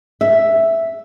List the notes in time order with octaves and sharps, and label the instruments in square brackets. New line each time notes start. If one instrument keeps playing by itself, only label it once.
[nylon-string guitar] E5